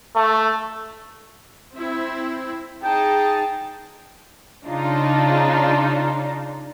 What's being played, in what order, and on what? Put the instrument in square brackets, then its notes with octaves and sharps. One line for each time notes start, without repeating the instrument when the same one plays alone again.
[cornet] A3
[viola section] C4 E4
[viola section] D#4 G#4 A5 [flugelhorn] G5
[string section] C#3 D4 D#4 F4